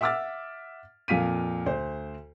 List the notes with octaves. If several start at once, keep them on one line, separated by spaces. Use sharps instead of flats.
E5 F#5 D6 E6 F6 A6
F2 A#2 F5 B6 D#7
D2 C5